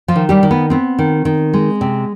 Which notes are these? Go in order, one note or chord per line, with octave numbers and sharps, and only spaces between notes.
F3 F4
D#3
G3 G4
D#3
B3
B3 C4
D#3
D#3
G#3
C3